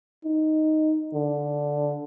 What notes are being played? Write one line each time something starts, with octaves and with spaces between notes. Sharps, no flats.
D#4
D3